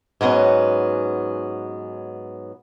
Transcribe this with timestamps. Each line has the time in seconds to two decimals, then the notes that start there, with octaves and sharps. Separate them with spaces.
0.21 G#2 F#3 B3 C#4